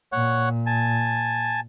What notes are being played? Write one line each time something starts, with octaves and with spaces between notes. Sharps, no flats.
A#2 C#5 F#5
G#5 A5